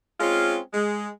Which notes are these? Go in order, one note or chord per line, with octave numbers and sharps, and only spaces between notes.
G#3 C4 C#4 F4
G#3